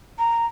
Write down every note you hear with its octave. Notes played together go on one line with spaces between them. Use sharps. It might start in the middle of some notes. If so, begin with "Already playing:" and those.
A#5